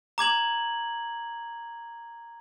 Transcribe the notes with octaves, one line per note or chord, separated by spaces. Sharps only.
A#5 D6 G#6 F#7